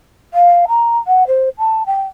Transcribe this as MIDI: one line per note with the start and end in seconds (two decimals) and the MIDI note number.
0.33 0.65 77
0.68 0.97 82
1.07 1.26 78
1.27 1.49 72
1.58 1.86 81
1.86 2.01 79